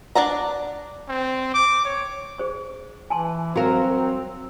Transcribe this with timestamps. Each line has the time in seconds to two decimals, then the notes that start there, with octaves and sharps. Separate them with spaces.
0.15 D4 D5 F#5 A#5
1.08 C4
1.54 D6
1.85 C#5
2.38 G#4 C5 C#6
3.10 E3 G#5 A5 C6
3.56 F#3 C4 F#4 A#4 F5 A#5